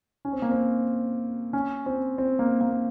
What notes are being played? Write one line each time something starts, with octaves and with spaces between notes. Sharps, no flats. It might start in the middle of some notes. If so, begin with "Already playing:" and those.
C#4
C4
A#3
C4
C#4
C4
C4
A#3
A#3